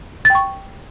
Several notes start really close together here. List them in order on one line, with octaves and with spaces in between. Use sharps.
A6 G5 C#6